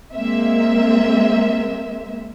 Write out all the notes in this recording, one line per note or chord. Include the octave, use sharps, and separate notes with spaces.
G#3 A#3 C4 E5